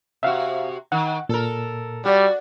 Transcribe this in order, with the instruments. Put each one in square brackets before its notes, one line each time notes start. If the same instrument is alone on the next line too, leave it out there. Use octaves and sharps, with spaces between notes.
[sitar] C3 F#4 [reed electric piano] E5 F5
[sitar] D#3 [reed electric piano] F#5
[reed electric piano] A#2 [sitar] A4 A#4
[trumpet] G3 [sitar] F#4 [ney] D5